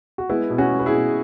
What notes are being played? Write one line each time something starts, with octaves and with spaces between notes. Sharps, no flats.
F#4
G#3 B3 E4
B2
C#4 F#4
G#3
B4
E4 G#4
B2